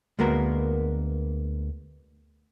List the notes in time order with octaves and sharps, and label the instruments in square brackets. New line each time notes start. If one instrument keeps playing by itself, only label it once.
[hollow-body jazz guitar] D2 G#3 A#3 B3 F#4 A#4